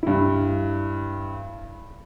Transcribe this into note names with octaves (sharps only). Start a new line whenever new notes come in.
G2 E4